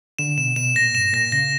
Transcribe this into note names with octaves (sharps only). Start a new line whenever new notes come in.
D3 E7
B2 E7
B2 E7
A#2 A#6
G2 E7
A#2 A#6
C#3 A#6